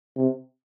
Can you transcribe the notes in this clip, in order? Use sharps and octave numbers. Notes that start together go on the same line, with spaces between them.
C3